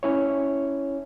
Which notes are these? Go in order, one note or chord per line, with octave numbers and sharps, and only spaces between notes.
C#4 E4 C#5